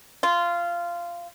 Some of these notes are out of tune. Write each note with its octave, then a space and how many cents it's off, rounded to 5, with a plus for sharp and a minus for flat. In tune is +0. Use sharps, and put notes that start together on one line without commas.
F4 -15